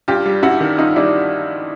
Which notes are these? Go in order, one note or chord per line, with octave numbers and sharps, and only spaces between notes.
G2 F4 G4
G3
G2 E4 F#4
D#3
G2 D#4 F4
G3 D4 E4